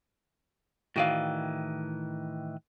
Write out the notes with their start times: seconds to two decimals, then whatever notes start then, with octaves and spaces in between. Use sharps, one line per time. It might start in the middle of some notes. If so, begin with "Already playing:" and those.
0.96 A2 D#3 E3 F#4 D5 F5